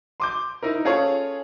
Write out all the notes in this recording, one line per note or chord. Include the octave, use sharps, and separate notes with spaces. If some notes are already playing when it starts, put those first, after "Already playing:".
C6 D6 G6
D#4 E4 A#4
C#4 F4 G#4 A4 C#5